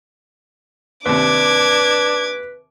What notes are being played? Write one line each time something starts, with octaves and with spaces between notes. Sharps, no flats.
D#2 C3 D4 B4 D6 G#6